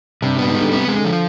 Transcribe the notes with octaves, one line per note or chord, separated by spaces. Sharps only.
G2 C3
G2 B3
G#2
G3
D3
C3 B3
G#3
D3
F3